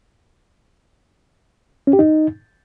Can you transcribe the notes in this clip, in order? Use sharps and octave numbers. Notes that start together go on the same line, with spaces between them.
C#4
G4
D#4